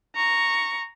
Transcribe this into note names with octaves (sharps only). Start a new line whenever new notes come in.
A#5 C#6